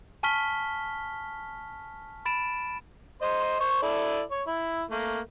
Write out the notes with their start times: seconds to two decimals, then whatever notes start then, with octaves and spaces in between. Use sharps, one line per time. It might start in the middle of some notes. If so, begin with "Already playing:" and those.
0.23 G#5 A5 C#6 F6 B6 G7
2.26 B5 A6 D7 E7
3.22 C5 D#5 C6
3.60 C5 C#6
3.82 E4 A4 D5
4.31 C#5
4.47 E4
4.91 A3 A#3